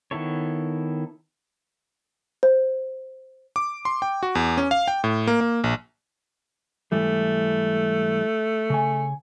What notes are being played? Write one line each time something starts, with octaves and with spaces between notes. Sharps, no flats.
D#3 B3 E4 A4 C#5
C5
D6
C6
G5
F#4
E2
C#4
F5
G5
A2
A#3
A#3
A#1
G#2 E3 G3 A3
C#3 G#5